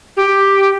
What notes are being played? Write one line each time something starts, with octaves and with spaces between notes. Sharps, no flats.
G4